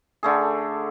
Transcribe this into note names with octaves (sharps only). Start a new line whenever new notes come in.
D3 A3 G#4